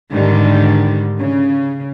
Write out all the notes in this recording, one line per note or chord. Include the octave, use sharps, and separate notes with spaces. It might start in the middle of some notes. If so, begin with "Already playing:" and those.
G#2 D3 D#3 G3
C#3